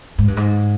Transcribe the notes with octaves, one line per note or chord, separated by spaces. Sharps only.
G#2
G2
G#2